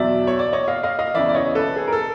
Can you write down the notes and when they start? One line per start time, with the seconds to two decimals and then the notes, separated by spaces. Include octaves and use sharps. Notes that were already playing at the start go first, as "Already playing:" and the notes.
Already playing: E2 B2 F#3 D5 E5
0.27 C#5
0.39 D5
0.53 C#5 D#5
0.68 D#5 F5
0.83 D#5 F5
0.99 D#5 F5
1.14 E2 C#3 E3 D5 E5
1.29 D5
1.35 C#5 D#5
1.55 A4 B4
1.76 G#4
1.87 A#4
1.93 A4